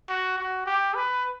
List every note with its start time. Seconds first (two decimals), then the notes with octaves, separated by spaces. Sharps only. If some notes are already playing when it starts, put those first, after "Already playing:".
0.09 F#4
0.38 F#4
0.66 G4
0.95 B4